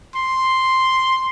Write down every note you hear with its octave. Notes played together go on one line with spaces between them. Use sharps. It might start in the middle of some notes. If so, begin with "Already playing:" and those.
C6